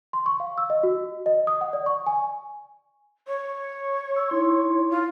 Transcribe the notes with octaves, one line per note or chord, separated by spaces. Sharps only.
C6
C#6
F5
E6
D#5
F#4
D#5
D#6
F#5
D5
C#6
G#5
C#5
E6
D#4 E4 C6
F4